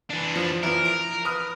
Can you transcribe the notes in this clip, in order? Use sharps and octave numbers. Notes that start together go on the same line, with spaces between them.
E3 D4
F3
E3 F3 A#4
D7
B4 D#6 F6